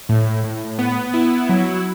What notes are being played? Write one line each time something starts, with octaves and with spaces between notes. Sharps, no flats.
A2
A2
B3
E4
F#3